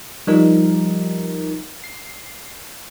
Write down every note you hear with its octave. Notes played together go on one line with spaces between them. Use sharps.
F3 G3 D#4 A#4
C7